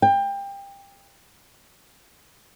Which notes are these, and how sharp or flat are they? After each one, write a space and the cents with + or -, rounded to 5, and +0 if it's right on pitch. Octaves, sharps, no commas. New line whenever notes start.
G5 +20